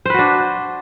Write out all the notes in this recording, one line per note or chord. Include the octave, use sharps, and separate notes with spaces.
D4 F#4 B4 C5